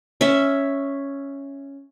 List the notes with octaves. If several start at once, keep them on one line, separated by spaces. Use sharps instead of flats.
C#4 E5